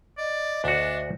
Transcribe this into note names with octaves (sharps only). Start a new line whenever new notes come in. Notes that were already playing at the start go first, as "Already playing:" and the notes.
D5 D#5
D2 D4 F#4